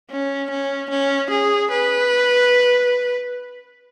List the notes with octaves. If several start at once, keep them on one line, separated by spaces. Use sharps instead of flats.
C#4
C#4
C#4
G#4
B4